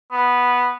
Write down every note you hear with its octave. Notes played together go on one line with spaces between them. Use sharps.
B3